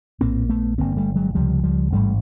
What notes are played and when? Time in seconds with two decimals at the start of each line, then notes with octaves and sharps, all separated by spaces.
0.21 A#1 A2 A#3 C4
0.49 A3 B3
0.78 G1 G2 D3 A#3 C4
0.97 G3 A3
1.16 F#3 G#3
1.35 C#2 C3 F3 G3
1.63 F3 G3
1.92 A1 G#2 G3 A3